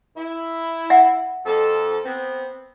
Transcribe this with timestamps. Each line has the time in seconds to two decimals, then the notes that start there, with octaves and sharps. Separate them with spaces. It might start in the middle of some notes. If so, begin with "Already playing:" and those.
0.17 E4
0.90 E5 F#5
1.46 F2 A4
2.05 B3 C4